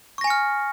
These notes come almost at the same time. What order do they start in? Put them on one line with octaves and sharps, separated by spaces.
C#6 A#6 G#5 C#7 F6